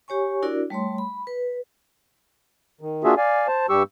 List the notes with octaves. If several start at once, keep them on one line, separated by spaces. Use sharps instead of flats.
G4 C#5 G#5 C#6
D4 E4 F#4 A#4 D5
G3 A3 C#5 C6
B5
B4
D#3
A#3 D4 F4 F#4 G#4 E5
D5 F5 G#5
C5 A5
G2 G3 G4 C#6 E6